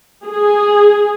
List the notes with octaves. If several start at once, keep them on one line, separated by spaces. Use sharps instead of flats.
G#4